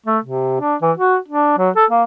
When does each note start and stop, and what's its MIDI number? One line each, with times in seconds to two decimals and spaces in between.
0.06 0.18 57
0.24 0.57 48
0.60 0.75 62
0.82 0.92 52
0.97 1.16 66
1.28 1.57 62
1.58 1.70 54
1.76 1.85 69
1.90 2.03 58